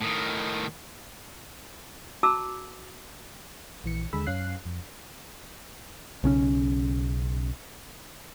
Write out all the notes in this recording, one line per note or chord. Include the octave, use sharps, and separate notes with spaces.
A2 D#3
F#4 A5 A#5 D6 E6
A#1 E3 C#7
D#2 D3 G#3 G#4 B5 E6
F#2 C#4 F5 F#6 C7
F2
B1 C#3 C#4